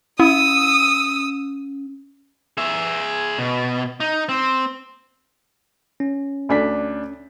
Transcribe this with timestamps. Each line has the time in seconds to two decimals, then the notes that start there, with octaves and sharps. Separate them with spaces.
0.20 C#4 E4 D#6 E6
2.57 G#4 E5
3.39 B2
4.00 D#4
4.29 C4
6.00 C#4
6.49 D2 D4 B6